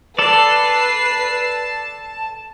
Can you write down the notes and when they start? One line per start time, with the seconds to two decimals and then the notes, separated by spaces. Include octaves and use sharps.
0.19 A4 B4 D5 A5 C7